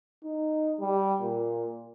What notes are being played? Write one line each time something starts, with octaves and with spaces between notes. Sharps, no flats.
D#4
G3
A#2